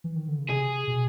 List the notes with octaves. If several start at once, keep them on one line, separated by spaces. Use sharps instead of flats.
E3
D#3
D3
C#3
C3 G#4
B2